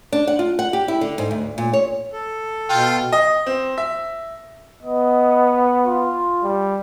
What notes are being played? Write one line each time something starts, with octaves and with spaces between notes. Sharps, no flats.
D4
F#5
F4
F#5
G4
E4
D3
G#2
D2
A#2
C#5
A4
B2 F4 G5
D#5
C4
E5
B3 D#5
F4
G3